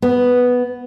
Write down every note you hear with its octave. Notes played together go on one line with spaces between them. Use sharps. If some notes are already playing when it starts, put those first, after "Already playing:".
B3